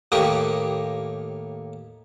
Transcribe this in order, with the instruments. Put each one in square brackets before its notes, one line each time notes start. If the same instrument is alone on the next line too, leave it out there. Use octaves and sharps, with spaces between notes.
[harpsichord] D#2 A2 A#3 D#4 G4 C#6